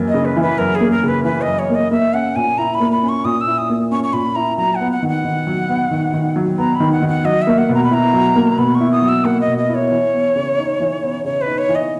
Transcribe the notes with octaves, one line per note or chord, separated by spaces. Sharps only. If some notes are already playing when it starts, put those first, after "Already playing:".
Already playing: F#2 E3 A#3
D#5
C#3
B4
E3
B4
F#2 A#4
G#4
A#3
A#4
C#3 B4
E3 B4
D#5
F#2
C#5
A#3
D#5
A#3 E5
C#4 F#5
A#2 G#5
E4 A#5
B5
A#3
B5
C#4
C#6
A#2 D#6
E6
E4
D#6
A#3
C#4 C#6
C#6
A#2 B5
E4 A#5
F#3 A#5
F#5
B3
F#5
D#3
F#5
D#3
F#3
B3
D#3
D#3
F#3
B3 A#5
B5
D#3
F#5
D#3
F#5
F#3 D#5
E5
A#3
F#5
B2
A#5
B5
E4 A#5
F#3
A#3
B2 B5
C#6
E4
D#6
F#3
E6
A#3 F#5
D#5
B2
D#5
E4
C#5
E3
B3
C#3
D#4
E3
B3
C#3 C#5
B4
D#4
C#5
E3
D#5